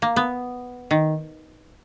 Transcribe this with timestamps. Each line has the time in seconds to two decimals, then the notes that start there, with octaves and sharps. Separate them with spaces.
0.02 A#3
0.16 B3
0.91 D#3